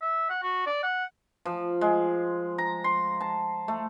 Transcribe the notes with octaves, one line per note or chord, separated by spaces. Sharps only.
E5
F#5
F#4
D5
F#5
F3
G#3
A#5
C6
A5
A3